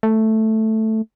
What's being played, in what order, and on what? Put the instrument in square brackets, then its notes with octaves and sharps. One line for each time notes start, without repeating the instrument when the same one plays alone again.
[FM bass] A3